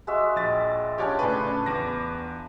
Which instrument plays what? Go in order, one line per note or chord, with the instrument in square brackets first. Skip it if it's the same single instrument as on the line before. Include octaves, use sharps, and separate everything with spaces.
[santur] G#3 F#4 E5
[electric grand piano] A#1 A6
[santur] C#4 D4 F4 [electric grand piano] G4 C#5 D5
[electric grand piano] A2 C#3 B4 [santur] D4
[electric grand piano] E2 B4 A#6 [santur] D6